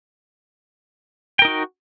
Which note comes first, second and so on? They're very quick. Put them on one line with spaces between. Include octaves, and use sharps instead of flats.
G5 A#4 D#4 F#4